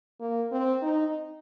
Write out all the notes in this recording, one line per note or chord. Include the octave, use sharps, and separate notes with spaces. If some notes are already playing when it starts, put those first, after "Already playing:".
A#3
C4
D#4